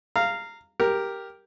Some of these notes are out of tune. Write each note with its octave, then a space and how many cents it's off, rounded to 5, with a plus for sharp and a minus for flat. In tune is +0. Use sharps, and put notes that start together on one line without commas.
F5 -10 A#5 -20
G4 +0 A#4 +0